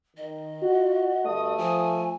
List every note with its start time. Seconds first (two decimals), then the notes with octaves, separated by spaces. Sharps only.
0.17 D#3 D#5
0.62 F4 F#4
1.25 D2 G2 A3 D#6
1.58 F3 G#5